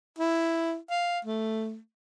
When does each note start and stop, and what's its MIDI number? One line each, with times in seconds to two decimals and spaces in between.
0.18 0.76 64
0.90 1.19 77
1.25 1.77 57